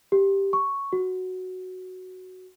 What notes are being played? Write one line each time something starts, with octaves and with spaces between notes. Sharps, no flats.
G4
C#6
F#4